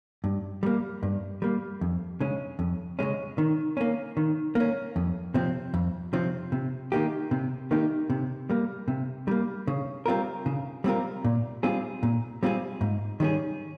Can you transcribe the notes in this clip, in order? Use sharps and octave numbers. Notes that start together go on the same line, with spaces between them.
G2
G3 A#3
G2
G3 A#3
F2
C#3 G#3 C#4
F2
C#3 G#3 C#4
D#3
A#3 C#4
D#3
A#3 C#4
F2
C3 F3 C4
F2
C3 F3 C4
C3
D#3 A#3 D#4 G4
C3
D#3 A#3 D#4 G4
C3
G3 A#3
C3
G3 A#3
C#3
G3 C4 F4 A#4
C#3
G3 C4 F4 A#4
A#2
G3 C4 F4 G#4
A#2
G3 C4 F4 G#4
G#2
D#3 G3 C#4 G#4